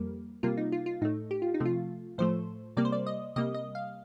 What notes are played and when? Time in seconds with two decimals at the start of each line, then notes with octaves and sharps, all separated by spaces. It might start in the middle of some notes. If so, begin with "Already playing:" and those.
Already playing: F2 G3 A#3
0.43 C3 G3 A#3 F4
0.57 D#4
0.72 F4
0.86 F4
1.01 A2 A3 D#4
1.31 G4
1.42 F4
1.54 D#4
1.60 C3 F3 A3
1.65 F4
2.18 A2 F3 A3 C5
2.77 C3 G3 A#3 D5
2.85 C5
2.92 D5
3.07 D#5
3.36 C3 G3 A#3 D#5
3.55 D#5
3.75 F5